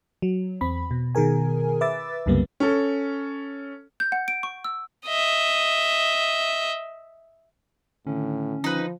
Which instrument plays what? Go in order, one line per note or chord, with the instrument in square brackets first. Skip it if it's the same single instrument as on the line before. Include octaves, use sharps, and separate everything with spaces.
[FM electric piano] F#3
E2 C4 B5
B2
B2 D#3 G#4 A#4 G#5
B4 E5 D6 E6 A6
C2 F#2 C#3 G3 A#3 B3
[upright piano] C#4 A4
[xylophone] G6
F#5
D7
C#6
E6
[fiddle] D#5 E5
[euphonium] A2 [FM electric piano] D3 D#3 [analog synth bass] C#4
[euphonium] F3 [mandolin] D#4 B4